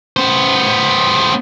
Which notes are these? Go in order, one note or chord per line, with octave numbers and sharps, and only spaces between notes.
B3 C5